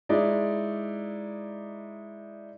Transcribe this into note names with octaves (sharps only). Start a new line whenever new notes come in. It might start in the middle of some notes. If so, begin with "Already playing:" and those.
G#3 D#4 E4 D5